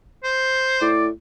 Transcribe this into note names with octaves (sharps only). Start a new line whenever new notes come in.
C5
A2 D5